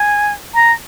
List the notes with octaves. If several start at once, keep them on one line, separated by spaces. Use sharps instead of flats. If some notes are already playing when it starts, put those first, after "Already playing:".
Already playing: G#5
A#5